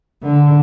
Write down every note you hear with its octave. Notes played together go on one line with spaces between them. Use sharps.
D3